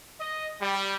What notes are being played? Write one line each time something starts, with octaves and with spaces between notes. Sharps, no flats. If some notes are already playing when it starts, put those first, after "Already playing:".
D#5
G3